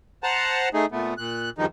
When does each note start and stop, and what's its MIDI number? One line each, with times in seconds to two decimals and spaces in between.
0.23 0.69 72
0.23 0.69 78
0.23 0.69 81
0.23 0.69 82
0.74 0.86 57
0.74 0.86 63
0.74 0.86 68
0.92 1.14 46
0.92 1.14 57
0.92 1.14 59
1.18 1.50 46
1.18 1.50 90
1.58 1.66 40
1.58 1.66 43
1.58 1.66 51
1.58 1.66 53
1.58 1.66 63